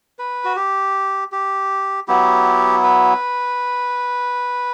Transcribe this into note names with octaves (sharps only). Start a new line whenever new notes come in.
B4
F#4
G4
G4
F#3 B3 E4 G4
B4